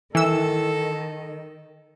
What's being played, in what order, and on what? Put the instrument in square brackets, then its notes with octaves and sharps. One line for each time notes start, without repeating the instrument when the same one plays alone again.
[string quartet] D#3 [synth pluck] E3 E6 [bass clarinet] A4